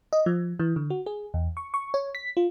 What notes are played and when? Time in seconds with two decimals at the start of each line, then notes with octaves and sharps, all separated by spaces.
0.13 D#5
0.26 F3
0.60 E3
0.76 D3
0.90 F#4
1.06 G#4
1.34 E2
1.57 C#6
1.74 C#6
1.94 C#5
2.15 B6
2.37 F4